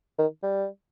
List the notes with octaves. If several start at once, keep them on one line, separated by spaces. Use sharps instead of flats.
D#3
G3